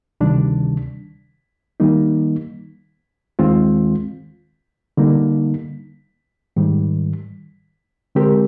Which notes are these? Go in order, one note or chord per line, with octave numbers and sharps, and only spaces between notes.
D2 C3 D#3 G3 D4
D#3 G3 A#3 D#4
D#2 D#3 G#3 C4 F4
D3 G3 A#3 D#4
G#2 D#3 G3
D3 G#3 C4 G4 A#4